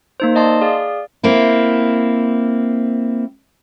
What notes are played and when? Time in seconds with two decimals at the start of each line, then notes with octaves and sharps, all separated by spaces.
0.20 A#3 D#4 C5
0.35 D5 D#5 A5 C6
0.61 G#4 D5 F5
1.23 A#3 C4 E4